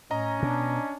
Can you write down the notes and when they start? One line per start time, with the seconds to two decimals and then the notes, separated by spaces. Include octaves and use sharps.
0.11 A2 C#4 D#5 A#5
0.43 B2 D4